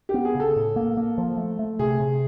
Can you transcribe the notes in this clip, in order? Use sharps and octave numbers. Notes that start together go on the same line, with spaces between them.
G4
B3
G#4
C#3
A4
A2
A#3
A#3
F3
A3
A3
C3 G#4
C3